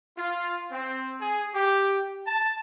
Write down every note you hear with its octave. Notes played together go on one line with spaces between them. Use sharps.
F4
C4
G#4
G4
A5